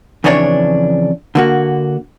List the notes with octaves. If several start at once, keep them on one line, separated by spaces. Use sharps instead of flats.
F2 C#3 E3 D4 E4 C#5
D3 A#3 F#4